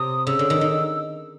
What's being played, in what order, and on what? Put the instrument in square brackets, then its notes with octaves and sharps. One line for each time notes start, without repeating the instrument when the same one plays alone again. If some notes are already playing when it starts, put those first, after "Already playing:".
Already playing: [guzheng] C3 [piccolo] D#6
[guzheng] C#3 [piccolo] E6
[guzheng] D3
D#3
D#3